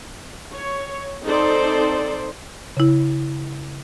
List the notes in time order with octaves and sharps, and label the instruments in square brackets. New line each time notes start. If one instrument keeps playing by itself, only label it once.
[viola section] C#5
C4 D#4 A4 C5 D5
[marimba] C#3 E4